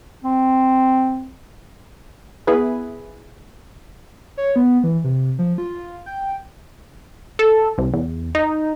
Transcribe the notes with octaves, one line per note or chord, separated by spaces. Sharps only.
C4
B3 E4 G#4 B4
C#5
B3
E3
C3
F3
F4
G5
A4
C2
E2
D#4